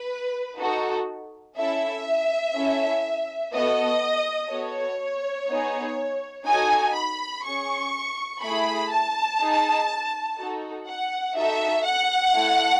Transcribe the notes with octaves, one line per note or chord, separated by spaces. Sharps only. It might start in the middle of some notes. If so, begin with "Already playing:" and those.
Already playing: B4
D#4 F#4 A4
C#4 E4 A4 E5
C#4 E4 A4
B3 F#4 A4 D#5
B3 F#4 A4 C#5
B3 D#4 G#4
D#4 F#4 A4 G#5
B5
C#4 G#4 C#6
A3 E4 G#4 B5
A5
D#4 G#4
D#4 F#4 A4
F#5
D#4 F#4 A4 E5
F#5
A3 E4 A4